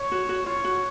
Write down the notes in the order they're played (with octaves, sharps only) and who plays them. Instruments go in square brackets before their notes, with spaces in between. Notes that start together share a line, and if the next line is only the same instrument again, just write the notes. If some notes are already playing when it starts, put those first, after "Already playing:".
Already playing: [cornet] C#5
[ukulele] F#4
F#4
[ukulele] F4 [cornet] C#5
[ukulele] F#4